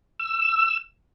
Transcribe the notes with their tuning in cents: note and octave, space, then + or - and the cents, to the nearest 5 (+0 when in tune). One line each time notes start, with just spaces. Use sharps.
E6 +15